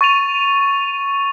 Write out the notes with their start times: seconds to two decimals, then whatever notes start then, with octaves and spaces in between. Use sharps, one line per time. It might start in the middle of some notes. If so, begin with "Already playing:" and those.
0.01 C#6 A6 D#7 F7